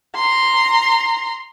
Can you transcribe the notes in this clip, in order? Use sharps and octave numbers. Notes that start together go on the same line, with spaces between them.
A#5 C6